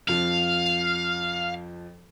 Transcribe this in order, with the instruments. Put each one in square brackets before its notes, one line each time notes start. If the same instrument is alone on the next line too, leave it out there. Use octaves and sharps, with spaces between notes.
[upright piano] F2 F3 [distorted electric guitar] F5